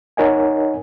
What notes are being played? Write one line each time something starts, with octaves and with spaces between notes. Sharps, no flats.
D#4 A#4 C#5 D#5 F#5 G#5